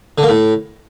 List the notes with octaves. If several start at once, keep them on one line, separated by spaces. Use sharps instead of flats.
D3
A#3
A2